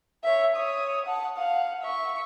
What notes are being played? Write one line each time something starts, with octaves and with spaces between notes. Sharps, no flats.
C#5 E5
C#5 D#6
F#5 A5
F5 F#5
E5 C#6